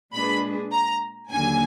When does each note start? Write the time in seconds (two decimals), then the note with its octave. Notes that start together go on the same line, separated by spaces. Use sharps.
0.14 A#2 G#3 D4 G#4 B4 B5
0.72 A#5
1.31 D#2 D3 F#3 A#3 G#5